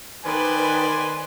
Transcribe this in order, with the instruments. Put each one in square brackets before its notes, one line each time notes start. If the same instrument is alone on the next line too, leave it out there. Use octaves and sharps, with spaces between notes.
[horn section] D#3 [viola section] B4 [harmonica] C5 D5 [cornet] G#5